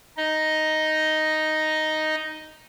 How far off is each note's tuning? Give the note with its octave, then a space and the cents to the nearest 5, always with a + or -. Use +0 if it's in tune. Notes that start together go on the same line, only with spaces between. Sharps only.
D#4 +0 D#5 +0